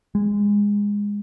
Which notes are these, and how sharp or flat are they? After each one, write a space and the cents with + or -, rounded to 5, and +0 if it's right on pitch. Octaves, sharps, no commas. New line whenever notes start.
G#3 -20